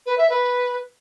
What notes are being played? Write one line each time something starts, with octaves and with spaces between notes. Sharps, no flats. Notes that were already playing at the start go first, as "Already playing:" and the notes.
B4
E5
B4